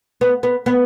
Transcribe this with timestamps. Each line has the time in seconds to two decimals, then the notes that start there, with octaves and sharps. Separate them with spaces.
0.21 B3
0.43 B3
0.66 B3